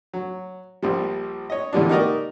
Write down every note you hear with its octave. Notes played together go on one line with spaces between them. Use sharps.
F#3
A#1 F3 G3
C#5 D#5
A#2 D3 E3 G3 G#3 D4
D#4 F#4 G4 A#4 D5 D#5